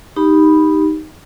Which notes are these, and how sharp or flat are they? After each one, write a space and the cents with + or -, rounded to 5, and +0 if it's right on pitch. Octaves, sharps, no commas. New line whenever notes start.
D#4 +0 G4 +0 B5 +0